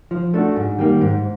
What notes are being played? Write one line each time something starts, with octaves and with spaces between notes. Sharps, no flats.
F3
A3 D4 F#4
G#2
D#3 G3 A#3
G#2